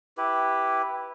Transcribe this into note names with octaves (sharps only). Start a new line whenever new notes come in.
E4 G4 B4